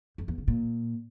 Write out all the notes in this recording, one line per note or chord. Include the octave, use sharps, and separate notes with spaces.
F2
E2
C#3
A#2